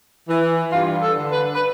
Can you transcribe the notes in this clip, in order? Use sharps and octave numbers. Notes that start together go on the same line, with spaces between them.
E3
G2 F4
A4
D3
B4
B4